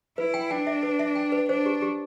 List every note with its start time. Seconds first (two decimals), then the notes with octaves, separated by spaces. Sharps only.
0.18 E4 B4
0.34 G5
0.51 D4 G5
0.67 E5
0.83 B4
0.99 E5
1.15 G5
1.32 B4
1.49 D4 C5
1.66 G4
1.82 G4